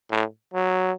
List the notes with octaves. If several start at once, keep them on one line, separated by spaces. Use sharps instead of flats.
A2
F#3